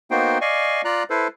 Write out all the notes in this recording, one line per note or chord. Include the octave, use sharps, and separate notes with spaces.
A#3 B3 D#4 F#4 C5 G5
D5 D#5 F5 G#5 C#6
F4 D5 A#5 F#6
E4 A4 B4 C5